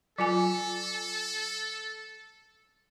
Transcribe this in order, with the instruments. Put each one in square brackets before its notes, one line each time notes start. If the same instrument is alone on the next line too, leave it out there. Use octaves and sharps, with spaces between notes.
[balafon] F#3 F4 G#5 [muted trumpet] A4